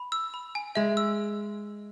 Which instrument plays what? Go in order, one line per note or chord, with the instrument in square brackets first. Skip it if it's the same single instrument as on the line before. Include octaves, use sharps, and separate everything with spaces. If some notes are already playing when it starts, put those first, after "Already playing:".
Already playing: [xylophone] B5
E6
B5
G#5
[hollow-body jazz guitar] G#3 [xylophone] E5
[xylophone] E6